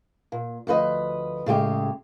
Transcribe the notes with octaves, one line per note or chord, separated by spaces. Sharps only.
A#2
D2 F3 B4 D#5
A2 C#3 G#3 G4